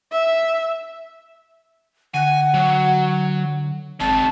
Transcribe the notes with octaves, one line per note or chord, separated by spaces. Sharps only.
E5
D3 F#5 G#5
F#3
G#1 G#3 C4 A5